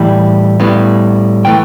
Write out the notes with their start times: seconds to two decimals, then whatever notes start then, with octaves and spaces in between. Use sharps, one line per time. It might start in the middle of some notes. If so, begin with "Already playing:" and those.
Already playing: A2 E3 G3
0.60 A2 G3 B3
1.45 E3 A3 G5